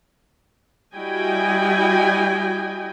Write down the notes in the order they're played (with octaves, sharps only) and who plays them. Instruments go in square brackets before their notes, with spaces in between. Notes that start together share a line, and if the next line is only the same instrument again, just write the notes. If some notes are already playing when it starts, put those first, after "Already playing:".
[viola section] G3 E4 F#4 D#5 G5 G#5